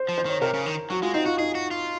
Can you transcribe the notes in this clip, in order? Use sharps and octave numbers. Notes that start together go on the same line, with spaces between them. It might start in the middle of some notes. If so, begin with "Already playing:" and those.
Already playing: C5
F3
C5
D#3 C#5
C3 A#4
C#3
D#3
F#3 F#4
G#3 F4
C4 D#4
F4 F#4
D#4 G#4
F#4
F4